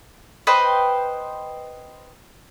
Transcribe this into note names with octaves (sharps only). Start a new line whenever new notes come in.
B4 C5 D#5 G5